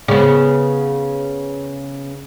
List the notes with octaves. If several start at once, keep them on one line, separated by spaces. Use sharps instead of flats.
C#3 B3